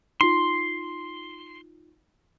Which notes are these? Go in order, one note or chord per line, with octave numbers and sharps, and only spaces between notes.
D#4 F4 C6